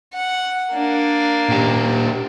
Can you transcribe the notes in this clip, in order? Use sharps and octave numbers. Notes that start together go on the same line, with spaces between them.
F#5
A#3 D4
A#2 G4